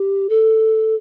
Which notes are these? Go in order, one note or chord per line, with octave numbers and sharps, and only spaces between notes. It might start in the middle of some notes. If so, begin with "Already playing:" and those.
Already playing: G4
A4